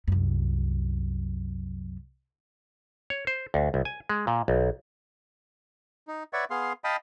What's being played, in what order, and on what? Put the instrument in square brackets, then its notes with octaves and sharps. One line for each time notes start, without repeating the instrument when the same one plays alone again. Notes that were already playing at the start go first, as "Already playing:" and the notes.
[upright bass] C2 F#2
[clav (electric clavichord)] C#5
C5
D2
C2
G#5
G#3
A#2
B1
[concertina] D#4
B4 C#5 D5 E5 F#5 C#6
B3 G#4 F5 C6
D#5 F5 G5 A5 B5 D#6